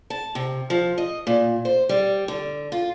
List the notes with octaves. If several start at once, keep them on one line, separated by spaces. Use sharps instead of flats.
A5
C3
F3
D#5
A#2
C5
G3
D3
F4